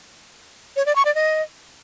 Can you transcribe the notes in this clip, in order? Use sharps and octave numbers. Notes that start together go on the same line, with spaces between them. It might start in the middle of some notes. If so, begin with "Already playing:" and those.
C#5
D5
C#6
D5
D#5